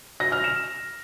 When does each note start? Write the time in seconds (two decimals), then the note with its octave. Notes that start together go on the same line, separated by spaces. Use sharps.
0.20 A#6
0.32 F6
0.44 E7